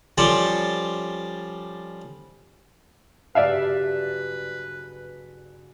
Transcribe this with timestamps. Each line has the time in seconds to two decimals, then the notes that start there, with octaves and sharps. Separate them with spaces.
0.18 F3 G3 C#4 A4 C5 D5
3.35 F#1 G2 B4 D5 E5 F5